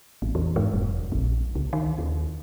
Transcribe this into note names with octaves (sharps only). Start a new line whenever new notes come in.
A1
E2
G#2
F1
A#1
C#2
D#3
D#2